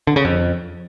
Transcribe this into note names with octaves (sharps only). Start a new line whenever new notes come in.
D3
C#3
F2